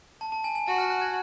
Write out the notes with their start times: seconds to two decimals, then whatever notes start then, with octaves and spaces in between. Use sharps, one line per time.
0.21 A5
0.32 A5
0.44 G#5
0.55 G#5
0.67 F#4 A5
0.78 F6
0.90 F#6
1.01 G#6